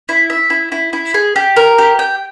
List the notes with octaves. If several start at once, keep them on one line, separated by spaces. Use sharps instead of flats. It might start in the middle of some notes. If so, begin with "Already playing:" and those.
E4
E5
E4
E4
E4
G#4
G4
A#4
G4
G5